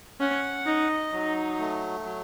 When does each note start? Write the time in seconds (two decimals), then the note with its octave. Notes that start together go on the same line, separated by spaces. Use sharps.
0.20 C#4 F#5
0.66 D#4 D#5
1.12 F#3 D#4
1.59 A3
2.05 F#3